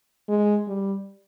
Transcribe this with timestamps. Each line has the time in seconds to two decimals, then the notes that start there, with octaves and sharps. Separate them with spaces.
0.29 G#3
0.68 G3